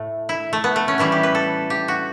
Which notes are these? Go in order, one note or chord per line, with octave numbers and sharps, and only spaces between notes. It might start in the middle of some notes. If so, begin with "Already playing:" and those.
Already playing: A2 A3
E4
A3
B3
A3
C#4
A2 E3 G3 E4
G4
B4
A4
G4
F#4